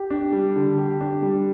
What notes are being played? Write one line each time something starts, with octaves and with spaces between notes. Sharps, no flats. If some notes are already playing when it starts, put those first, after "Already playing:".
Already playing: G4
D4
G3
D3
G4
D4
G3